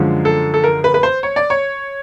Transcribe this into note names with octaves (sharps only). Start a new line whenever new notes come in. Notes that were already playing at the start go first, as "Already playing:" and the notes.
Already playing: F#2 D3 F3 G#3
A4
A4
A#4
B4
B4
C5
C#5
D5
C#5